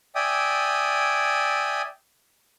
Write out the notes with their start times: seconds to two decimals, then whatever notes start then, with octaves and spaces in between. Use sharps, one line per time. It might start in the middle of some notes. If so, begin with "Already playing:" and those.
0.15 D5 E5 G5 G#5 D#6